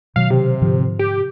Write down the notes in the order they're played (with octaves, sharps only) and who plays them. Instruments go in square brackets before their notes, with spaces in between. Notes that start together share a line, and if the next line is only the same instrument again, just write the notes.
[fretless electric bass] B2 D#3 F#3 [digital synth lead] F5
[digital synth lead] C3
[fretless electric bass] G#2 D3 F3
[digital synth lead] G4